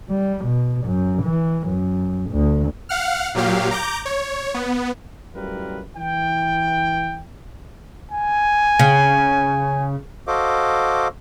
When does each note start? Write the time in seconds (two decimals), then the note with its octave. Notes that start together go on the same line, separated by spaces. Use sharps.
0.10 G3
0.45 B2
0.86 F#2
1.23 E3
1.68 F#2
2.31 D2
2.89 F5 F#5 F6
3.35 A#2 F#3 G4 F5
3.71 A#5 D6 G6
4.05 C#5
4.54 B3
5.34 F#2 A2 G3 F4 A#4 B4
5.97 E3 G5
8.11 G#5
8.79 C#3
10.27 F#4 A4 C5 D#5 F5 D6